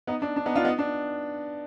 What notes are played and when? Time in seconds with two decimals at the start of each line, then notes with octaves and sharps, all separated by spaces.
0.07 B3 D#4
0.22 D4
0.36 D4
0.46 B3 D#4
0.55 D4 F4
0.64 B3 D#4
0.79 D4